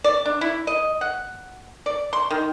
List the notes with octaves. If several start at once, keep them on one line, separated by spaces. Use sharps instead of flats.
D5
D4
E4
D#5
F#5
D5
C6
D#3